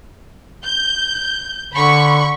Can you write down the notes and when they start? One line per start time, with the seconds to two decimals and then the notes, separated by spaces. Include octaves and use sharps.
0.63 G6
1.73 D3 B5 C#6